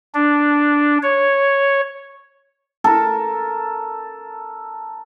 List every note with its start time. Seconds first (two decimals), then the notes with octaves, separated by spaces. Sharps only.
0.14 D4
1.02 C#5
2.84 A4 A#4